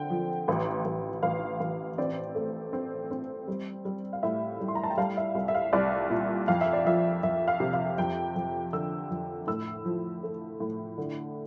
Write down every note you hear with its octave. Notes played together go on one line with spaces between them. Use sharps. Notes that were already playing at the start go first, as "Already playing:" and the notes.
Already playing: D3 C4 G5
F3
A1
A1
A1 F5
A1
C4 D5
A3
C4
C4
G3
G3
F5
A2 E5
G3
C6
A#5
A5
G5
G3 F5
E5
C2
E5
F5
C2 D5
A#2
F2 F5
E5
D5
F3 E5
F2 E5
F5
C3
F5
F2 G5
F2
D3 E6
F2
A2 E6
F3
A3
A2
D3